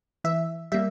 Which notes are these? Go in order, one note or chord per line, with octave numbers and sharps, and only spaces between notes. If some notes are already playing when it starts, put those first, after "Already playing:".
E3 E5
G3 A#3 E5